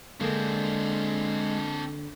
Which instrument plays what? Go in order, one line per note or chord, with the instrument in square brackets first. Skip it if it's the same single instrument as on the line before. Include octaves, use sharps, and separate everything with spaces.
[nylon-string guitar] D3 A#3 [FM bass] G#3 [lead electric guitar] C4 D4